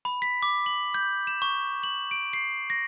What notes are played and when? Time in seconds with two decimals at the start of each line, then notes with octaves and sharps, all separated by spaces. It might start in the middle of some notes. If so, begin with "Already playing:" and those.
0.05 B5
0.22 B6
0.43 D6
0.66 F#7
0.94 G6
1.27 E7
1.42 C#6
1.83 F#7
2.11 D7
2.33 C7
2.70 A#6